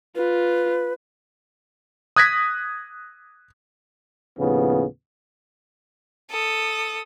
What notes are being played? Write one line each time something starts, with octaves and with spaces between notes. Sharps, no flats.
F4 B4
D#6 F#6 G#6 A#6 B6
D#2 A2 C#3 F3 B3
A4 D#6